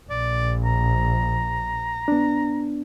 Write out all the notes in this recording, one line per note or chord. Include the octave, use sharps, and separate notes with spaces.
A#1 D5
A#5
B3 D4